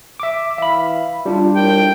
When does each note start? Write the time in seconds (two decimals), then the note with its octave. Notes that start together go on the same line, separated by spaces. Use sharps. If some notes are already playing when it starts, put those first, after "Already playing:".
0.20 E5 D6
0.58 E3 E5 F5 B5
1.26 G3 D4 E4 F4
1.56 F2 A2 A#4 G5